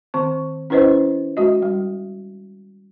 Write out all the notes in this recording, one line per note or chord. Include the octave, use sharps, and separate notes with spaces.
D#3 C4 C#6
C#4 E4 B4 C5 D#5
G#3 F#4 D#5
G3